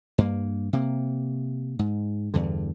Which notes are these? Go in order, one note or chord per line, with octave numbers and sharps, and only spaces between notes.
G2 A#3
C3 A#3
G#2
E2 G2 D3